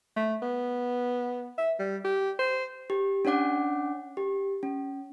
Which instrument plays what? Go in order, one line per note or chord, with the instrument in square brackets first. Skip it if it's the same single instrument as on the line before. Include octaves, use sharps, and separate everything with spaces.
[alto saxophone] A3
B3
E5
G3
G4
C5
[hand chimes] G4
C#4 D4 C#5 F#5 D6
G4
C#4